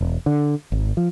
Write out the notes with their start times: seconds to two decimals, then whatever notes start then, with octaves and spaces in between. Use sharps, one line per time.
0.01 E1
0.26 D3
0.72 G#1
0.97 F3